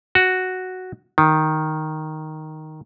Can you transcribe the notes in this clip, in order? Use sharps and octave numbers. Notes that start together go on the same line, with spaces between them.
F#4
D#3